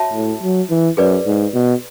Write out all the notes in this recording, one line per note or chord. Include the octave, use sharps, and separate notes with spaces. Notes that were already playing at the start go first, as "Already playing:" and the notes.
Already playing: F#4 C#5 E5 A5
A2
F#3
E3
F#2 G#4 B4 D5
G#2
B2